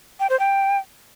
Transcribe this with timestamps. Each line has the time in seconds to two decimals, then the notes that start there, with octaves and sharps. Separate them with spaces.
0.20 G5
0.30 C5
0.40 G5